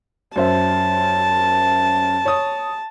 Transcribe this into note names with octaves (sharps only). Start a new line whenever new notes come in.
F#2 C5 E5 A5
C#5 D#6